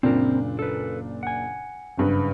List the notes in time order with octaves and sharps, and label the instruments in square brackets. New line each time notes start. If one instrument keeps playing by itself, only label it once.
[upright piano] F#1 A#2 D4 [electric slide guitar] C4 A#4
[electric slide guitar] A4 B4
F#5 G#5
[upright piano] F#1 G2 B4